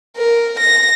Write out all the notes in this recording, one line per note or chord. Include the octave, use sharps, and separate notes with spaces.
A#4
A#6